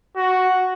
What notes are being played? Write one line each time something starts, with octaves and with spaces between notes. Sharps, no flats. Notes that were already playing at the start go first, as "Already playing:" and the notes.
F#4